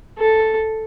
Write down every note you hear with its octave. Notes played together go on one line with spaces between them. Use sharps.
A4